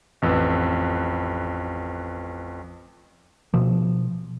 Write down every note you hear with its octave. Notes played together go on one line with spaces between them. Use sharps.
A1 F2 B4 E6
B2 F3